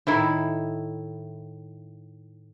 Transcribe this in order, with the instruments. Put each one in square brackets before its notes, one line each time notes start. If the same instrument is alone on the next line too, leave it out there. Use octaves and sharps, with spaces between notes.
[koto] A2 D#3 E4